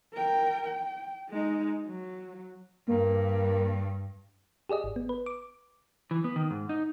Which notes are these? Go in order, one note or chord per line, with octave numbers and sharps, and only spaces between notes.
A#4 G5
G5
G#3 D#4
F#3
G2 A#3
G4 G#4 D5 D#5
G#1
B3
B4
D6
E3
B3
D#3
G#2
D#4